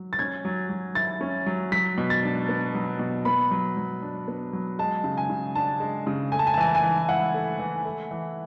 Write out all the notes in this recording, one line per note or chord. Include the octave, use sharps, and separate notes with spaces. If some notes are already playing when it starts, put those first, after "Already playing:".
Already playing: F#3
A6
C#4 G#6
F#3
F#3
E4 A6
C#4
F#3
F#3 B6
B2
A6
D4
B3
F#3
B2
B3 B5
F#3
F#3
D4
B3
F#3
G#3 A5
C#3
G#5
C#3
D4 A5
G#3
C#3
A3 G#5
A5
G#5
A5
E3 G#5
A5
G#5
E3
E4 F#5
A3
E3
A3
E3